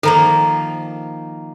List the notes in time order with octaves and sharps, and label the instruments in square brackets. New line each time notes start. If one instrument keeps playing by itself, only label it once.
[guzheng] D#3 F3 A#3 [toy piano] A4 A#5